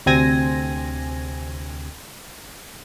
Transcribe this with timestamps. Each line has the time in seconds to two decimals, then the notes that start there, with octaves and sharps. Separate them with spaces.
0.06 D2 C3 C4 G#5 A#6